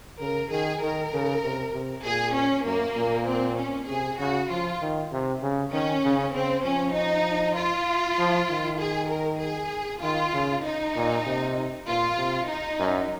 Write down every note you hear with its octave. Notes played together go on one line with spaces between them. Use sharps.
C#3 A#4
D#3 G#4
D#3 A#4
C#3
C3
C3
A#2 G#4
C#4
F#2 A#3
A#2
C4
C#4
C3 G#4
C#3 F#4
F3 F4
D#3
C3
C#3
D#3 C#4
C#3
C#3 C4
F3 C#4
D#4
F4
F3
D#3
G#4
A#4
G#4
D#3 F4
C#3
D#4
A#2
C3
A#2 F4
C3
D#4
F#2